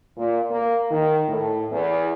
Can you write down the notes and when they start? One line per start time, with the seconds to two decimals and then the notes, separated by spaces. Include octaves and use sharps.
0.17 A#2
0.51 A#3
0.91 D#3
1.28 A2
1.71 E2